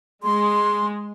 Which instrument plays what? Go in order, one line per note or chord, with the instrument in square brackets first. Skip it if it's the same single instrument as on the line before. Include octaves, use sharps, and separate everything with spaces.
[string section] G#3 [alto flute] C6